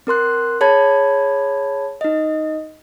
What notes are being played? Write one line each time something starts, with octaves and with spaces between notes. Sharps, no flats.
C4 A#4 C6 F#6
G#4 C#5 A5 B5 G#6
D#4 D#5